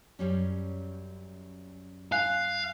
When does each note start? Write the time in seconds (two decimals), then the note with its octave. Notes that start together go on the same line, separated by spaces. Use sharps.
0.19 F#2 G3 C#4
2.12 F5 G#5 F#6